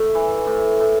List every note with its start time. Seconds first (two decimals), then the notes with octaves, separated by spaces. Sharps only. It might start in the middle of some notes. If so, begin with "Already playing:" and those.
Already playing: A2 A3
0.15 E3
0.47 A2
0.80 A2